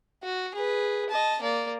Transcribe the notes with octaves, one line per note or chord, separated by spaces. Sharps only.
F#4
G#4 B4
D#5 A5
A#3 D5